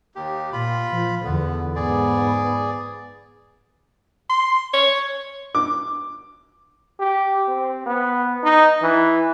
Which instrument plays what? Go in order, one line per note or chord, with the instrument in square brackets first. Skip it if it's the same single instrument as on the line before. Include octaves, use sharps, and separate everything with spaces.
[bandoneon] D#2 G4
[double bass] A#2 [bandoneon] F4 B5
[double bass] F3
[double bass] E2 D3 [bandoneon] B3
[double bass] G#2 B3 [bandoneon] G#4 D5
[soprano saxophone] C6
C#5
[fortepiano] D6
[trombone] G4
C4
B3
D#4
E3